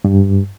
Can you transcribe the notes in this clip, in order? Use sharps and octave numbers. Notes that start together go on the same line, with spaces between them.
G2